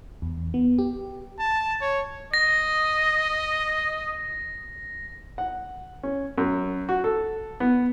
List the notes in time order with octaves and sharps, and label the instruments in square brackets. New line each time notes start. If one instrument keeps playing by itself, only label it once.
[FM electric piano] E2
B3
G4
[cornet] A5
C#5
[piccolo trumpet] D#5 [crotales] A#6
[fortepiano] F#5
C#4
F#2
F#4
A4
B3